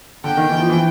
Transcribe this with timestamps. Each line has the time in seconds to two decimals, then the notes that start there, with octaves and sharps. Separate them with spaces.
0.24 D3 G5
0.37 D#3
0.49 E3
0.59 F3
0.70 E3